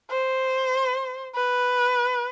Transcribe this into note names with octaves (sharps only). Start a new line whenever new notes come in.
C5
B4